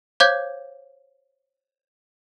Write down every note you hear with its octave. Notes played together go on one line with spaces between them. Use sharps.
C5 C#5 F5 D6 G6 G#6